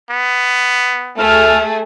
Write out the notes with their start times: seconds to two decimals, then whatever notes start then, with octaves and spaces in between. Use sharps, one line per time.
0.10 B3
1.18 D2 A3 G#4 A4 F6